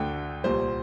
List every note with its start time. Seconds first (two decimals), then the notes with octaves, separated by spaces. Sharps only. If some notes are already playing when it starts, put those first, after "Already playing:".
Already playing: D2 D3 A3 G5
0.44 C2 A#2 G3 C5